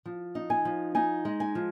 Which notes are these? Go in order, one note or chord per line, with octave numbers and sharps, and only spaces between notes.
F3
D#4
G#5
F3
D#4 G#5
G#3
G#5
F3